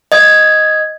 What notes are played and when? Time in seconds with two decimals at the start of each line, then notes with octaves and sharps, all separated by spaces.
0.12 D#5 G#6